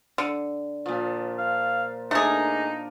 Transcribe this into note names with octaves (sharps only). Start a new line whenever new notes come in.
D3
A#2 F3
F5
A3 D4 D#4 G#4 A#4